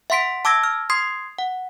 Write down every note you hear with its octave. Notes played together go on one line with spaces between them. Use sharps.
E5 F#5 C6 B6 D7
A5 D6 E6 G#6 A#6
F6
C6 D#6 G#6 C7
F#5